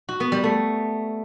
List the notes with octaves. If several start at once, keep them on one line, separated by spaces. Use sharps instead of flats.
F#4
B3
G3
A3